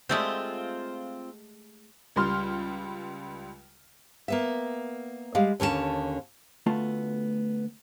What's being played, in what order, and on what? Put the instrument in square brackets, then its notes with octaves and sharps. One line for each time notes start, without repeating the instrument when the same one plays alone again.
[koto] G#3 A3 G4 [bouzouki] C4 F4
[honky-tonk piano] C#2 G3 C6 F6
[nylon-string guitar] A#3 B3 E5
G3 G#3 F5
D#2 D3 C#4 E4 A5
[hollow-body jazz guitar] D2 A3 B3 F4 A5